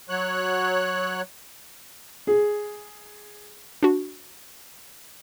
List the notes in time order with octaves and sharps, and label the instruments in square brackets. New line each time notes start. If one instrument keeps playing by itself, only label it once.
[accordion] F#3 C#5 F#6
[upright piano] G#4
[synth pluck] D4 F#4